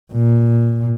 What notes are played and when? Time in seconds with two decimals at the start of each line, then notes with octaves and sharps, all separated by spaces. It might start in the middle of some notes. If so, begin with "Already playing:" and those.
0.12 A#2